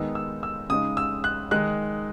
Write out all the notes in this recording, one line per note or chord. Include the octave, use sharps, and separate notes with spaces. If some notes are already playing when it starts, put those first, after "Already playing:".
Already playing: D#3 G#3 B3 D#4 E6
E6
E6
C#3 G#3 D#4 D#6
E6
F#6
D#3 G#3 D#4 F#6